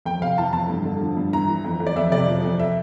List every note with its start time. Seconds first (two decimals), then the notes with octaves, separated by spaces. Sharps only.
0.06 F2 G5
0.22 C3 F5
0.38 E3 A5
0.53 F2 A5
0.69 G2
0.85 D3
1.01 F3
1.17 G2
1.33 E3 A#5
1.48 E3
1.65 F2
1.80 F2
1.87 D5
1.96 F2 E5
2.12 C3 D5
2.28 F3
2.44 F2
2.59 E5